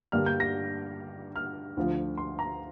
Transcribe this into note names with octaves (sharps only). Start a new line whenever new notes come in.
G2 D3 G3 A#3 D4 F6
G6
A#6
F6
D2 D3 F3
C6
A#5